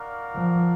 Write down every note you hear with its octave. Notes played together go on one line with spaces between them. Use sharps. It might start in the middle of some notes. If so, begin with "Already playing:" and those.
Already playing: D#4 F#4 A#4 D5 F5
F3